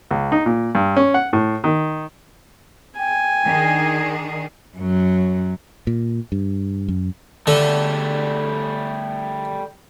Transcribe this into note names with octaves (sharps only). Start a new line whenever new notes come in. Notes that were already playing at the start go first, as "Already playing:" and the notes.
C#2
D#4
A#2
G2
C#4
F#5
A2
D#3
G5 G#5
D#3 D4 G#4
F#2 F#3
A#2
G2
F#2
D3 G3 A3